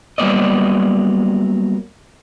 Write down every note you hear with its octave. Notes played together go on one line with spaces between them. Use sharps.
F#3 G3 A#3 B3 D5 D#5